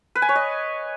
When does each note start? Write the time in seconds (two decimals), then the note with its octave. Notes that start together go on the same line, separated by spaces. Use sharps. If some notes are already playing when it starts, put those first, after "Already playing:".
0.15 B4
0.22 G#5
0.29 C#5
0.35 D#5